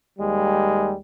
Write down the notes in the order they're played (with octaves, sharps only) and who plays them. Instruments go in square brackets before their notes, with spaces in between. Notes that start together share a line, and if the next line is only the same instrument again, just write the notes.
[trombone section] D#2 G3 G#3